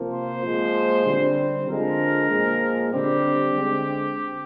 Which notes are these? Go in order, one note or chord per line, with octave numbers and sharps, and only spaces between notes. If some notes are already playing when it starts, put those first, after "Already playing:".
Already playing: C3 F3 A#3
C5
A#2 F3 G#3
D3 G3 C4
D3 F3 G#3 A#4
A#2 F3 G#3
D3 G3 C4 G4
D3 G#3 C4